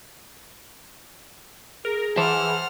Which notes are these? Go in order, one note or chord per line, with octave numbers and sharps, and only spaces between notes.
G#4 A#4
E3 C5 F#5 A5 F6